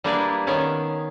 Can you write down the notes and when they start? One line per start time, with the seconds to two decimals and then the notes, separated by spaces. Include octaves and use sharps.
0.04 G3 A#3 D4 E4 G#4 B4
0.47 D#3 B3 C#4 G#4